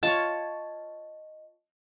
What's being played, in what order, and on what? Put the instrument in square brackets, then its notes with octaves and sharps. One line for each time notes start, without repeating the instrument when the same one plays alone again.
[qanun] F4 C#5 [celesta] D#5 [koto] A5